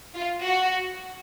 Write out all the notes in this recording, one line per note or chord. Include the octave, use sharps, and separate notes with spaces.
F4
F#4